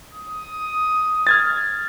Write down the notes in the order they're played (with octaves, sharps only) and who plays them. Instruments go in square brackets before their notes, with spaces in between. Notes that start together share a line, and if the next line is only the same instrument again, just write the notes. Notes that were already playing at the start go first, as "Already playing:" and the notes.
[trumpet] D#6
[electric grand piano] F6 G#6 A6